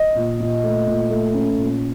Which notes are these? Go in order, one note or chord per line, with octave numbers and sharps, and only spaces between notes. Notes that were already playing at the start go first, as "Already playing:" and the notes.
Already playing: D#5
A#2
A#2
A3
A#2
A3
C#4
A#2